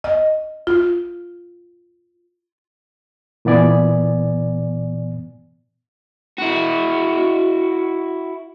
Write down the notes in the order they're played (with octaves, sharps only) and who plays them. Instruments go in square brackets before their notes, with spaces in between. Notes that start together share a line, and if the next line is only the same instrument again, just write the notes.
[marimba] D#5
F4
[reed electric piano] A#2 E3 B3 D5 G#5
[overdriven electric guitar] E4 F#4